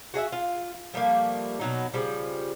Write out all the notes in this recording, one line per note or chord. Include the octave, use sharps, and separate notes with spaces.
F#4 G#4 D#5 E5
F4
F3 G3 A3 A#3
B2 F#3 D#4
C#3 F3 G3